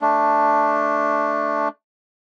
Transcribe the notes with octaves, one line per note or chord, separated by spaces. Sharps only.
A3 D4